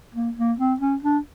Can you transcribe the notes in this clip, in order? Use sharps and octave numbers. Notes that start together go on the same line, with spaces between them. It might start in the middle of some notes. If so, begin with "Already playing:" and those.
A#3
A#3
C4
C#4
D4